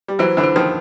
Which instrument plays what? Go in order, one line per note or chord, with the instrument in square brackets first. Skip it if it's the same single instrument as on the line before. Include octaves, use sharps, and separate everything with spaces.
[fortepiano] G3
[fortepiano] E3 F#3 [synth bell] C5
[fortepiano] D3 E3
[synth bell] C5
[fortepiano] D#3 F3